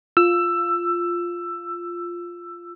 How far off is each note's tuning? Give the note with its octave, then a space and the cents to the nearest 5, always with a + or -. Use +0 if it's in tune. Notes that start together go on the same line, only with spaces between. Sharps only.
F4 +0 E6 +15